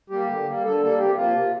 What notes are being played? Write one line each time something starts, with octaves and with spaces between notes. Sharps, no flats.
G3 A#3 G4
D3
G3 A#3
D3 A4
G3 A#3 A4
C3 G4
F3 A#3 F4
C3